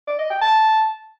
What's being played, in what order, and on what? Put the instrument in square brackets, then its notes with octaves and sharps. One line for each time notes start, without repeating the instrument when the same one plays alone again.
[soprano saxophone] D5
D#5
G5
A5